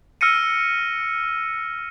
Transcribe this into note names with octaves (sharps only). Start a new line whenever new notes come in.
E6 F6 A#6 C#7 D#7